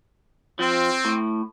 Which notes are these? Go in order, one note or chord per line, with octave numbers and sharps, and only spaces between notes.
F3 C4
A2